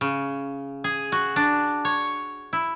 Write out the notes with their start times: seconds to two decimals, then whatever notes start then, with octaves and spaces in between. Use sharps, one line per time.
0.01 C#3
0.84 G#4
1.12 F#4
1.36 D4
1.85 C#5
2.53 E4